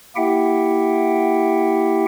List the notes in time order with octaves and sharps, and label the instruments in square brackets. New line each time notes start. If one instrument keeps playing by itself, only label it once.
[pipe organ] A#3 E4 G4 E5 F#5 G5